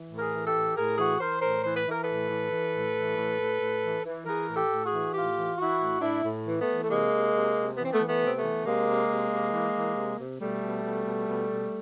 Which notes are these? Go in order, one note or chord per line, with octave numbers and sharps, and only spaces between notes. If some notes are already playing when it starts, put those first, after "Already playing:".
Already playing: E3
A2
G#4 A#4
E3
G4 A4
A2
A2 G#4 A#4
E3 F#4 G#4
E3 A#4 C5
A2 A#4 C5
E3 C5
B4
E3
A#4
A2 A4 B4
E3
E3
A2
E3
A2
A2
A2
E3
E3
E3 G#4 A#4
A2
G4 A4
A2
F#4 G#4
E3
A2 F4 G4
E3
E3 E4 F#4
A2
A2 D4 E4
A2
E3
A3 B3
E3
A3
C3 G#3 A#3
C3
C3
C3
E3 B3
C4
A3 B3
E3
A3 B3
C3 C4
A3 B3
E3
C3 G#3 A#3
C3
C3
C3
E3
E3
C3
C3
B2 G3 A3
B2
B2
B2
B2
B2